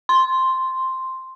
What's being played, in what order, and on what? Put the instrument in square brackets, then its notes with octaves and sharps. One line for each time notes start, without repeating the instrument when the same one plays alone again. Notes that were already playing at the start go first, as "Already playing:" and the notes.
[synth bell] C6